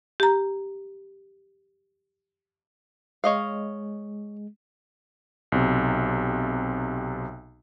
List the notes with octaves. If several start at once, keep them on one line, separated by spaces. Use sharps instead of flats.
G4 A#5
G#3 C#5 D#5 F5
B1 C3